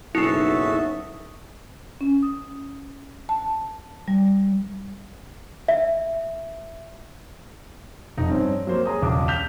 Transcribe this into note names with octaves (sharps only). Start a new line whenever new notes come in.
F#1 B1 D#4 E4 F#4 G#4 A4 E5
C#4
D#6
A5
G3
E5
F1 D#4
G2 C4 C#4
F#3 A#3 C5
G#4 A#5 D#6
E1 C#2 D6
G6 B6 F7